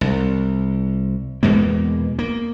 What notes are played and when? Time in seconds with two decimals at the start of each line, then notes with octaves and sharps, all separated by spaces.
0.01 C2
1.43 E2 B2 G#3 A#3
2.19 A#3